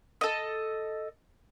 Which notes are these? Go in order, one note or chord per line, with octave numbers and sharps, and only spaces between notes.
A4 D#5